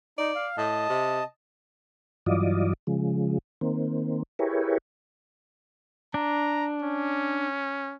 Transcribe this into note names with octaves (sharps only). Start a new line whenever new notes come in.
D#4 D5
F5
A2 D#5 A5
C3
G2 E3 F#3 F4 D5 D#5
C#3 F3 G#3
D#3 A#3 C4
E4 G4 G#4 A#4 B4 C#5
D4 A#5
C#4